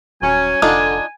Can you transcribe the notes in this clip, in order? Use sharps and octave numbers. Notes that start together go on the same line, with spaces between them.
D#1 F#3 C#4 G#5
F1 D3 D4 D#4 F4